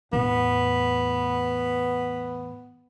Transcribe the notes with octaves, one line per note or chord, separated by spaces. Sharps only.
E2 A2 B3